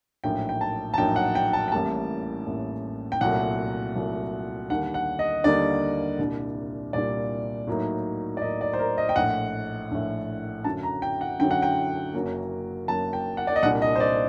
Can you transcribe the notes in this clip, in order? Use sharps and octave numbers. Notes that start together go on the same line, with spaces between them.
A#1 A2 F#3 A#3 D#4 G5
G5
A5
A5
A#1 A2 F#3 A#3 D#4 G5
F#5
G5
A5
G5
A1 A2 G3 A#3 A5
A1 A2 G3 A#3
G5
C2 A#2 F#3 A3 F#5
C2 A#2 F#3 A3
D#2 D3 G3 A#3 F#5
F#5
D#5
D#2 D3 G3 A#3 D5
C2 A#2 G3 D4
C2 A#2 G3 D4 D5
A2 F#3 A#3 D#4
D5
A2 F#3 A#3 D#4 D#5
D5
C5
A#4
D#5
G5
A#1 A2 A3 F#5
A#1 A2 A3
F#2 D3 F#3 A5
A#5
G5
F#5
F#2 D3 F#3 G5
F#5
G5
F#1 F#2 F#3 A#3
F#1 F#2 F#3 A#3 A5
G5
F#5
D5
D#5
C2 A#2 G3 D4 F#5
D#5
C5
D5